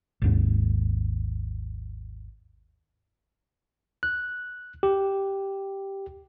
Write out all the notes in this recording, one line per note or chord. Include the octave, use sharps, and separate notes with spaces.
G#1 D#2 G#2
F#6
G4